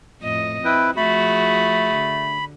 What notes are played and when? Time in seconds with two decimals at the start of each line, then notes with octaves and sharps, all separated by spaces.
0.22 F2 A2 D#5
0.65 C4 E4 B4 G5
0.97 F3 A3 F#4 G#4 B5
1.94 D3